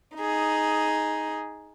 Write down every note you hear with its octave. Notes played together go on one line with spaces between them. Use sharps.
D#4 G#4